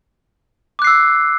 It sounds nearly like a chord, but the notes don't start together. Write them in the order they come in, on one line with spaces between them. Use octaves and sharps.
D6 F#6 C7 E6